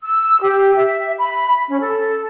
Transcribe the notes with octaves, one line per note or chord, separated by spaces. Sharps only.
E6
G4
E5
B5
C#4
A4